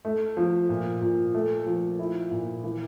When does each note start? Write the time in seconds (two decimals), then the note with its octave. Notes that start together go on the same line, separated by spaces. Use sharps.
0.05 A3
0.37 F3
0.69 A#2
1.01 A#2
1.34 A3
1.66 F3
1.99 E4
2.31 A#2
2.64 E3